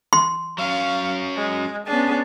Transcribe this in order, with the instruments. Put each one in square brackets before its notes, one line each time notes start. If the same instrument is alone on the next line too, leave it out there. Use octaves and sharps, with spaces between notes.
[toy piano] C6
[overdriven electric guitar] F#3 C#4 [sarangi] F5
[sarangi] G#3
[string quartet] B3 C#4 G#4 [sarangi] D4